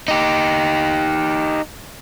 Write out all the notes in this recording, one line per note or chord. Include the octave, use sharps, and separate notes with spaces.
D#4 G4